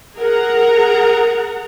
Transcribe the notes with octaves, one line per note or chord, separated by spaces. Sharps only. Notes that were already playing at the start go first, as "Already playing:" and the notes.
G#4 A#4 F#5 A#5